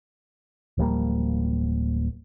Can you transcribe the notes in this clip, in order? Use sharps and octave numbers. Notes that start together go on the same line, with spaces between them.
D1 F3 G3 A#3